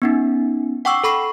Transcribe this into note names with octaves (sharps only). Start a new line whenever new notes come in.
B3 C#4 D#4
F#5 G5 C#6 D6 E6
A4 B5 C#6 C7